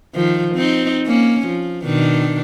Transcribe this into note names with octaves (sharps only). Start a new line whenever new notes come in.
D#3 F3
C4 D#4
A#3 C#4
F3
B2 D#3 D4